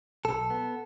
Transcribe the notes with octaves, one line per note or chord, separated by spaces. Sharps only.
B1 A4
B3